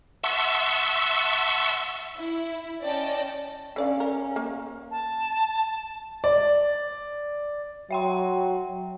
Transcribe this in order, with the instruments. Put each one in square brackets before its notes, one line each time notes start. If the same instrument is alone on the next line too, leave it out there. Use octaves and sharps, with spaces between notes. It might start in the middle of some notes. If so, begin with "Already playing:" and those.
[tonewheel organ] E5 F#5 A5 C6 C#6 E6
[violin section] E4
C#4 D5 D#5 G5 A5
[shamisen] D3 D5 F5 [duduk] C#4
[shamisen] A#4
A#3
[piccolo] A5
[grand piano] D5
[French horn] F#3 [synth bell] E5 G5 C6